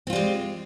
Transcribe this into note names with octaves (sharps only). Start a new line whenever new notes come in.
G3 G#3 C4 F4